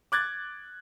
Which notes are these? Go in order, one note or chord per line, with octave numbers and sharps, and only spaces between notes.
D6 F#6 G#6 A6